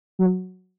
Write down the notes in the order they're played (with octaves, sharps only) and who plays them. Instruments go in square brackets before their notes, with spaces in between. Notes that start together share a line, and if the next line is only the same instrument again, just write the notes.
[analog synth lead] F#3